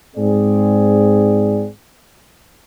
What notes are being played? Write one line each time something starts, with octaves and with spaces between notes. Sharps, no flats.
G#2 C4 G#4 D5